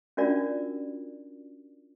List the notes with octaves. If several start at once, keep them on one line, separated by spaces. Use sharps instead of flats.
C#4 D4 F4 F#4 A#4 D5